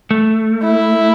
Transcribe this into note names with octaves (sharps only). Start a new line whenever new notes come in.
A3
E4